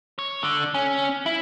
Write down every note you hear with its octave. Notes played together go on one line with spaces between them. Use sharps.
C#5
D3
C#4
E4